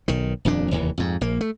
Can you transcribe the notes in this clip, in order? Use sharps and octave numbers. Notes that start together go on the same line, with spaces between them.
B1 D#3
D#1 F2 A#2 D4
F1 D#2 E3
F2 G#2
A#1 A#3
A3